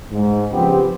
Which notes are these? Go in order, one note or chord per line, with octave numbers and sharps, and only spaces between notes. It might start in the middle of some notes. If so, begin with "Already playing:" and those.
G#2
C#3 F3 B3 C4 G4